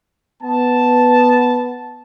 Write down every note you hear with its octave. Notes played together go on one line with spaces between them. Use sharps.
B3 A5